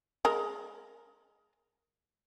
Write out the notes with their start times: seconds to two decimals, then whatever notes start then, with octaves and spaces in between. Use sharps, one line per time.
0.25 G#3 A#4